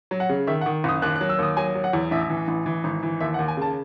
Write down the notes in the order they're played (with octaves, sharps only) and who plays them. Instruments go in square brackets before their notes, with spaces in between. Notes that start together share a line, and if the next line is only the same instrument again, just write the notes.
[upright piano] F#3
F#5
C#3
D#3 E5
F#5
D#3
F#1 D#6
D#2 F#6
F#6
F#3
E6
D#2 D#6
F#3 G#5
F#3
F#5
E2
A1 E5
E3
A1
E3
G#1
E3
D#2 E5
F#5
D#2
G#5
C#3 A5